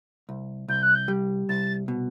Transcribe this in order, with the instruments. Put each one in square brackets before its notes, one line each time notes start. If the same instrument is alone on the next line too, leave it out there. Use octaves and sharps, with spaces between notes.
[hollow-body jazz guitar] C2
[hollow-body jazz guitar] C2 [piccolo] G6
[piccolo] F#6
G6
[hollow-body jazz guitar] G3
[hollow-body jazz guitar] C2 [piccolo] A6
[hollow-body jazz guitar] B2